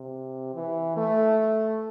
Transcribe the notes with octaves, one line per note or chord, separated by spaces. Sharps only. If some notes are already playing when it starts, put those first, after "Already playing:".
Already playing: C3
E3
A3